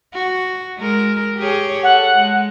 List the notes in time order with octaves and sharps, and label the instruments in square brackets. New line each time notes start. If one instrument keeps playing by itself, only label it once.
[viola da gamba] F#4
G#3 A#4
G4 G#4 C#5
[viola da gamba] A4 [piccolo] F#5
[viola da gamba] G#3